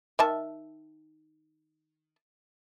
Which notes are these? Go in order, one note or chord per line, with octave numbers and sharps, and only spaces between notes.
D#3 E5 A5